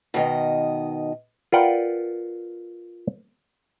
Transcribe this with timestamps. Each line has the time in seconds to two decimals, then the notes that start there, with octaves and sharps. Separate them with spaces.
0.14 B2 D#3 D#5
1.52 F4 A#4 B4 D5 F#5 G5